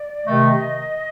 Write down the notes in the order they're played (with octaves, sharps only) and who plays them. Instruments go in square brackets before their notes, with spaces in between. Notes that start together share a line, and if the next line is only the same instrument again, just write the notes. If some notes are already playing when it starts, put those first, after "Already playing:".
Already playing: [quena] D5
[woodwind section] C3 D#3 A3 [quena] D#5